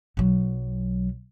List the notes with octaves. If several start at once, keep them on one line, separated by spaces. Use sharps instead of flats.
B1 F#3